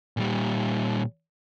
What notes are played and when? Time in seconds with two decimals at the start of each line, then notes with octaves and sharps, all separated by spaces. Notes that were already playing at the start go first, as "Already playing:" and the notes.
0.17 A#2 G3